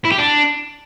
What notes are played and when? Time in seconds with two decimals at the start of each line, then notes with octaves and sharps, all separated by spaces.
0.05 E4
0.12 G4
0.18 D4